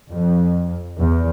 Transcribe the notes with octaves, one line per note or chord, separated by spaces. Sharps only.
F2
E2